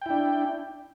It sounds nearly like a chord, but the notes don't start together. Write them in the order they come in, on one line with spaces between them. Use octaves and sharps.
G5 E4 D4